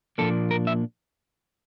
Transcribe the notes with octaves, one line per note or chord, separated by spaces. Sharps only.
A#2 F3 A#3 D4 A4
A#4
E5